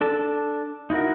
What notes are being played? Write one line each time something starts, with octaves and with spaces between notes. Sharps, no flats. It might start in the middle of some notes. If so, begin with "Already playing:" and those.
D4 A4 A5
D#4 E4 F#4 A#4